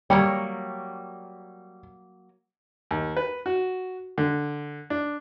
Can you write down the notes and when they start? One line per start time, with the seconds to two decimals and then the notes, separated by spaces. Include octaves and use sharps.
0.10 F#3 G3 A#3 C#5
2.91 D#2
3.17 B4
3.46 F#4
4.18 D3
4.90 D4